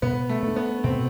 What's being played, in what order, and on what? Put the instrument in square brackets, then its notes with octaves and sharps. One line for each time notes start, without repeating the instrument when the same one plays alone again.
[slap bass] B2 [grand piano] B3
[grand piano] A3
[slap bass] A3 D4
[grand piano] B3
[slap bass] B2 [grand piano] C4